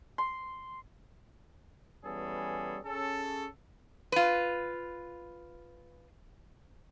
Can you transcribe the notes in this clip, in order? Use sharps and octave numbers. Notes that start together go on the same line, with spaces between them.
C6
E3 G3 B3 C#4 G#4 A4
C#4 G#4 A4
F4 B4